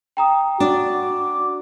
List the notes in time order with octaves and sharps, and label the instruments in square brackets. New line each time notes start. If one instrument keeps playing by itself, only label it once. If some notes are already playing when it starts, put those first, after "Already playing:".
[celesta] G5 A#5 D#6
[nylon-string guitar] D4 [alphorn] F#4 [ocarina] D6